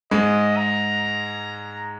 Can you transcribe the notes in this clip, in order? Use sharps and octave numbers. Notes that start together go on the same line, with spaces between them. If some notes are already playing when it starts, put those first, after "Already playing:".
G#2 G#3 D#5
A#5